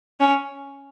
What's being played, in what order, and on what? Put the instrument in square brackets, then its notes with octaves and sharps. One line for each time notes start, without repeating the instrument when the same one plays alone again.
[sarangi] C#4